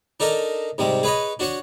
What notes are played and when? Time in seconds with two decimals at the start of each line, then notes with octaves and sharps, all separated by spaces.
0.20 D4 D#4 A4 A#4 D#5
0.78 G#2 C3 G3 G#3
1.03 G#4 B4 C#5 D#5
1.39 D4 F#4 C#5 C#6